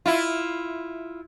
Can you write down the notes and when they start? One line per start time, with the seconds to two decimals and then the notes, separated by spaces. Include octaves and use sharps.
0.06 E4 F4